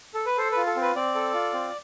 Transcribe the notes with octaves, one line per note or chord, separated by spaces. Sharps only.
A4
B4
A4 C5
F4 B4
A4
C4
B4
C4 D5
A4
F4
C4